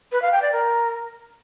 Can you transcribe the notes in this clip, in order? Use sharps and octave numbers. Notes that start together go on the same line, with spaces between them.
B4
F5
G5
D5
A#4